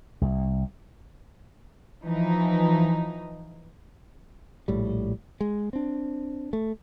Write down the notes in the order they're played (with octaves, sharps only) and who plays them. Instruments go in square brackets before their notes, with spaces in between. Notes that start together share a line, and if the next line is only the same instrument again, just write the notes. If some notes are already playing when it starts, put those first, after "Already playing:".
[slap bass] C2
[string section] E3 F3 D#4
[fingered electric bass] A#1 A2 G3
G#3
C4 D4
A3